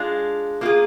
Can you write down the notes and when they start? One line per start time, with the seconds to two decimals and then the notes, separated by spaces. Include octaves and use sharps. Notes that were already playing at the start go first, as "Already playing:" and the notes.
Already playing: G#3 D4 F4
0.61 A#3 F4 G#4